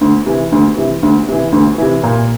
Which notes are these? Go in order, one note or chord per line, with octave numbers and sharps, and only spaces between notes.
D2
C3 E3
D2
C3 E3
D2
C3 E3
D2
C3 E3
A#2